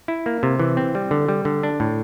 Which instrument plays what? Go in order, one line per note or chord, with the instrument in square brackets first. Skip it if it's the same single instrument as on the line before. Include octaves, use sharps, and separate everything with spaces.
[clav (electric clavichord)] E4
A#3
C3
E3
C4
G3
D3
G3
D3
D4
A2